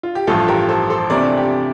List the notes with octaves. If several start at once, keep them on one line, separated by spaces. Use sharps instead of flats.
F4
G4
A1 G2 F3 A3 F4 A4
G4 A#4
A4 C5
A4 C5
C3 E3 A3 D4 A#4 D5
G4